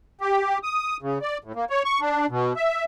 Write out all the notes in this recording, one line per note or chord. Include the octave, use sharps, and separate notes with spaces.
G4
D#6
C#3
D5
A2
A#3
C#5
C#6
D4
B2
E5